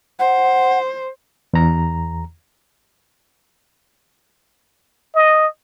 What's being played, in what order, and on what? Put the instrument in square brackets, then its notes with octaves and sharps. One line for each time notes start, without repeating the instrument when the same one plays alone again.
[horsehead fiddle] C5 [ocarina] F#5
[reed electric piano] E2 A#5
[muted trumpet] D#5